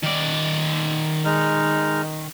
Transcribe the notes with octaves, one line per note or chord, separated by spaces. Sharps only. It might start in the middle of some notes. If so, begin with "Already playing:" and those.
D#3 D5
G#3 D#4 F6